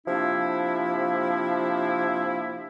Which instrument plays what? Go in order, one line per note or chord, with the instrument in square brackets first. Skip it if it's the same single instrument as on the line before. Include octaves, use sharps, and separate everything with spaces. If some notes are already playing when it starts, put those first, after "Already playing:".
[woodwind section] C3 F3 A#3 D4 E4